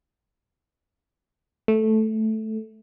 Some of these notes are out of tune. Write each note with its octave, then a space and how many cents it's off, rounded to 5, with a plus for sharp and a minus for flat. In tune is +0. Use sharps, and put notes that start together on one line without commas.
A3 -5